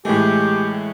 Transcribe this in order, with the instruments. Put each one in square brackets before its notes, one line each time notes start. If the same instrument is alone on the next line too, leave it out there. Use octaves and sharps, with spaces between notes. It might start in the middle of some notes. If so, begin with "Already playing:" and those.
[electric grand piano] A2 E3 A3 [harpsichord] G#3 [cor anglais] G4